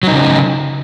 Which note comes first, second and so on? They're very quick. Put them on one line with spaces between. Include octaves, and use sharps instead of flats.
F#3 D#4 C#3